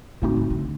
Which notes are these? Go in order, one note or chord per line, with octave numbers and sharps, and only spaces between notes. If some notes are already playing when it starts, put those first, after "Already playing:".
A2 D3 A3 C4 D#4 F#4
D3
D3